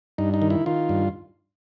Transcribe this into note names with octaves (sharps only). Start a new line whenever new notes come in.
G2 D#4
D#4
D#3
E4
D#3 F4
G2